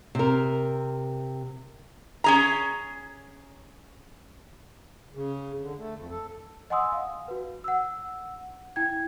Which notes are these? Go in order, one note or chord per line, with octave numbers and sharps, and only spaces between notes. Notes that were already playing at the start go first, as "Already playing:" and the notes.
C3 A#4
C#4 G#4 A#5
C#3
D3
A3
F2
A4
D#5 F#5 G#5 C6 D#6 E6
F5
F#4 B4
F#5 E6
E4 G5 G#6